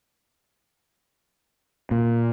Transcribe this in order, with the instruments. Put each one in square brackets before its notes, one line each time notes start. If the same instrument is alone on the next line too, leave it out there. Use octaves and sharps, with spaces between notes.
[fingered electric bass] A#2